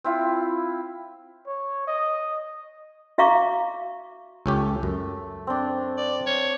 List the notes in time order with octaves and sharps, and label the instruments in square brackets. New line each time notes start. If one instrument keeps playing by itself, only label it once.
[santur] C4 E4 F4
[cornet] C#5
D#5
[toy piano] F#4 E5 F5 A#5 C#6 D6
[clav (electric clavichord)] C#2 C#4 G4 [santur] A3
[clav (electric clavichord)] F#2
[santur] C4 D4
[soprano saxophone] D5
C#5